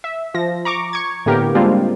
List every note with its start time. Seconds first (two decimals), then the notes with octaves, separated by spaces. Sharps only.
0.04 E5
0.34 F3 A#6
0.65 A#5 C#6 D6
0.93 C#6 G#6
1.26 A2 D3 A#3 B3 G4 A#4
1.55 G3 G#3 A#3 C4 D4 F4